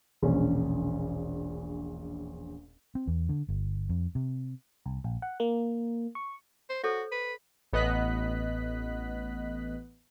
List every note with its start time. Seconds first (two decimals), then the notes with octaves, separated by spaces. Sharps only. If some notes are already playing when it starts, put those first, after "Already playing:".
0.22 E1 A#1 C#4
2.95 C4
3.07 E2
3.29 D3
3.49 G1
3.89 F2
4.15 C3
4.86 C2
5.04 A#1
5.22 F#5
5.40 A#3
6.15 C#6
6.70 C5
6.84 F#4 A4 C5 C#5
7.12 B4
7.73 A1 B3 D#5 F#6 B6